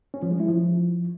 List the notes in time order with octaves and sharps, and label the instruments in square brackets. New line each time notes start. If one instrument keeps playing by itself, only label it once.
[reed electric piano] C#4
F3
G#3
E4
F3